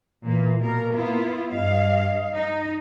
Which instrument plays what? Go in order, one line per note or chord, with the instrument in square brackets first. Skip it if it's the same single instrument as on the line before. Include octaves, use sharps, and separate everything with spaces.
[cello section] A#2 A#3 [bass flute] E3
[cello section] B2 A#4 [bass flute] A#3
[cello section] B3 E4 F4
[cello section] G2 F5 [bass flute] D#5
[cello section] D#4